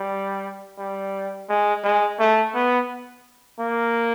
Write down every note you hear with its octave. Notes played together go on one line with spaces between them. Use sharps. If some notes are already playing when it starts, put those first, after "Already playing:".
Already playing: G3
G3
G#3
G#3
A3
B3
A#3